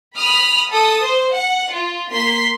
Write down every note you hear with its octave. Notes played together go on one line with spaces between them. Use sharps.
B5 D#6 F6
A4 D#6
C5
F#5
F4
A#3 C6 B6